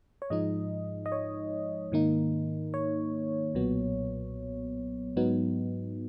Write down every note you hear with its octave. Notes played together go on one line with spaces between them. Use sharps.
C#5
G#2 F3 G#3 D#4 D#5
D#5
C#5
G#2 D#3 A#3 D#4
C#5
B1 A#2 F#3 B3
G#2 F#3 B3 D#4